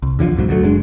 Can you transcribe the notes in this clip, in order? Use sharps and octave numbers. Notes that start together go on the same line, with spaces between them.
C2
E2 D3 D#3 F3
B1 F2 G#2 F#3
D2 F#3 A3
F#1 G#3 D4